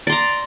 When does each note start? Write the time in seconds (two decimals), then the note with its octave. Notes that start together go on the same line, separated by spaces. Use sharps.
0.07 D5
0.10 C6
0.12 A#5